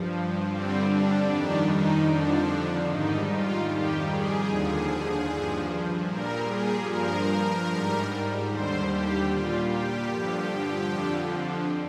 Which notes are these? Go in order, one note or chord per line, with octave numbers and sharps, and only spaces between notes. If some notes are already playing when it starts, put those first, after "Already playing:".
Already playing: G2 F3
G2 D3 G3 C4
D4
F2 D#3 G3 D4
D#4
F2 D3 F3 D4
G#2 D#3 G3 D#4
F4
F2 D#3 G3 G4
G#4
D#2 D3 F3
G2 F3
A#2 G3 A#4
G#4
G2 F3 A#4
G#2 G3
D#2 D3 G3 C5
G4
A#2 G3 F4
G4
G2 D3 F3
F2 D3 F3